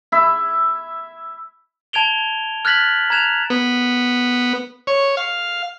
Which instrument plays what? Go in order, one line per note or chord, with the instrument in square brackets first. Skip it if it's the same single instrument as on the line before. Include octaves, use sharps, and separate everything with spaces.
[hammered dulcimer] E4 E5
[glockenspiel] A5 G#6 D7 F7 G7
F6 F#6 G#6 A6 B6 F#7
A#5 F#6 G#6 E7 F7
[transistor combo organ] B3
C#5
F5